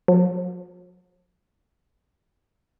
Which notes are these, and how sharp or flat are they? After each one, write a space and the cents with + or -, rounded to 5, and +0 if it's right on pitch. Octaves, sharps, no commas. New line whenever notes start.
F#3 -45